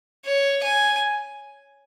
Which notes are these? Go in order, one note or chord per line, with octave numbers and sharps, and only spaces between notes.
C#5
G#5